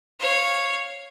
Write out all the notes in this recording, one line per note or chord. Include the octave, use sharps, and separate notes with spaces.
C#5 F5